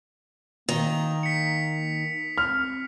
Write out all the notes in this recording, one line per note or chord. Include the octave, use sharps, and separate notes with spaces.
D#3 A#3 F7
B6 C#7
C4 F6